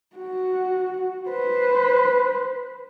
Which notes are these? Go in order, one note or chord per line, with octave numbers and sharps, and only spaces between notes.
F#4
B4 C5